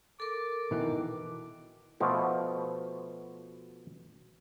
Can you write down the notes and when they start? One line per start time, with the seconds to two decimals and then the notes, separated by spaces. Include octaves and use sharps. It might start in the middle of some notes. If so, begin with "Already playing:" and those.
0.20 A4 A#4 D6
0.71 B2 D#3 E3
2.00 B2 F3 A3